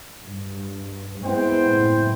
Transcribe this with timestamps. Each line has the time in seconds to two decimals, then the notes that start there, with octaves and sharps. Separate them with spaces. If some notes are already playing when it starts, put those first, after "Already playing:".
0.25 G2
1.23 G#3 B3 C4 E4 C5 G5
1.67 F#1 A2